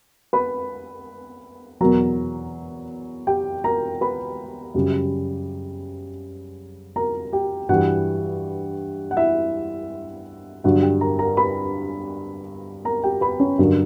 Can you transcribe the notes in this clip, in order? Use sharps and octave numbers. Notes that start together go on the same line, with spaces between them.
B4 B5
E2 B2 F#3 A#4 A#5
G4 G5
A#4 A#5
B4 B5
F#2 C#3 G3
A#4 A#5
G4 G5
G2 E3 G3 F#4 F#5
F#5
E4 E5
G2 D3 F#3 F#4 F#5
G4 G5
A#4 A#5
A#4 A#5
B4 B5
A#4 A#5
G4 G5
B4 B5
C#4 C#5
G2 D3 F#3 A#4